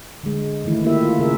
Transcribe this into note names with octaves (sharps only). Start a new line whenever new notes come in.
D3 G#3
D#3 E3 A3 E4
A#3 E4 F4 G4 E5
F4
C#3 G#4 A#4 E5